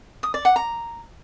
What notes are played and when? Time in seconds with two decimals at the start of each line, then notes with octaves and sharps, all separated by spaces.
0.23 D#6
0.34 D5
0.45 F#5
0.56 A#5